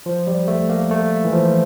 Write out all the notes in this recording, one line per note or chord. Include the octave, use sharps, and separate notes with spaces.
F3
G3
A3
A#3
A3
E3
F3